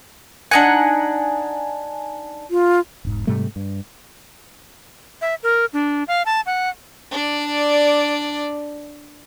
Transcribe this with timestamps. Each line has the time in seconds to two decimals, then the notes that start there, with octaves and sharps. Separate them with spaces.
0.51 D4 D#4 F#5 G#5
2.51 F4
3.05 E1 G#2
3.27 G#2 C3 G3 A3
3.56 G2
5.21 E5
5.43 A#4
5.73 D4
6.08 F5
6.26 A5
6.46 F#5
7.12 D4 D5